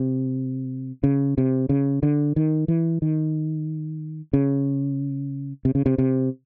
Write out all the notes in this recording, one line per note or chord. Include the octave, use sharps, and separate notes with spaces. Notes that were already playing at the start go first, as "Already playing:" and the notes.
Already playing: C3
C#3
C3
C#3
D3
D#3
E3
D#3
C#3
C3
C#3
C3
C3